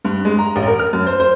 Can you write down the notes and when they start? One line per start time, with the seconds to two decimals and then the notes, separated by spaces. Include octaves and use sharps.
0.05 G2
0.25 G#3
0.39 A#5
0.56 A1
0.67 A#4
0.79 F6
0.93 F#2
1.07 C5
1.20 C5